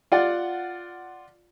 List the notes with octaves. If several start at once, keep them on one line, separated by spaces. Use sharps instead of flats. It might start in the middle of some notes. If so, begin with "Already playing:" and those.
F4 D5 F#5